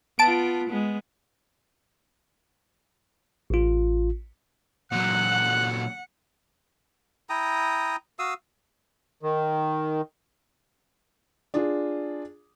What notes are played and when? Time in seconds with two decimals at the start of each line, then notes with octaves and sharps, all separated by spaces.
0.19 B3 F4 A5 D7
0.69 G#3 B3
3.50 A1 F4
4.92 A#2 F#3 F#5 F#6
7.30 E4 G5 A#5 D#6
8.19 F#4 F5 D#6 E6
9.22 D#3
11.54 D4 F4 G#4